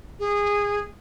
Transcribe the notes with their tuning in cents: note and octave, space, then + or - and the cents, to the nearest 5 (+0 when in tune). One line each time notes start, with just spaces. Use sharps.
G#4 -20